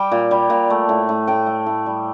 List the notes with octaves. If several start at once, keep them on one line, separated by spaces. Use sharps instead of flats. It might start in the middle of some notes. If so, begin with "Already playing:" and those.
Already playing: G3 G5
A#2
G3
A#2
A3
A2
A2
A2 G5
A3
A2
G3